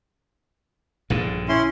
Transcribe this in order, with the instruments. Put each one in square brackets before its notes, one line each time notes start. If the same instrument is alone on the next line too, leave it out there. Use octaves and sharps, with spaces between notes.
[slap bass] A#1 G2 D3
[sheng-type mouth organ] C#4 E4 C6